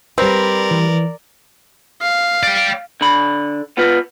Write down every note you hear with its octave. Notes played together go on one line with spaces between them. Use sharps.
G3 C4 A#4 B4 D5
E3
F5
D5 G5
D3 B5
B3 F4 B4